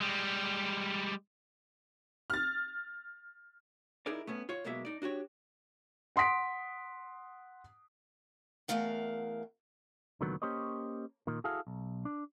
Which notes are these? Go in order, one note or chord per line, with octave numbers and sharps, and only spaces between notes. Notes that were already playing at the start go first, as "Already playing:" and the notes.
G3 G#3
F6 A6
D#4 E4 G#4 A#4 D5
A3 B3 C#4
F4 C#5
B1 B2 G#3 A#3 E5
D#4 D5
D4 F#4 G4 C#5
F#5 C6 D#6 B6 D7
E2 F3 A3 A#4 F5 F#5
C#2 A#2 D3 D#3 F#3 B3
A#3 C#4 G4 C5 C#5 D#5
A#2 D#3
E4 F#4 G#4 A4 F5
B1
D4